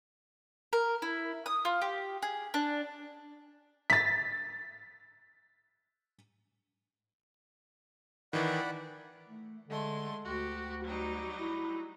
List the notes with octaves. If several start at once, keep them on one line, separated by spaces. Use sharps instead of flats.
A#4
E4
D#6
F4
G4
G#4
D4
A6 B6
D#3 E3 D5 F#5 B5
A3
D3 G#3 A3 C6
D2 F#4 G4
F#3 G3 D#4
E4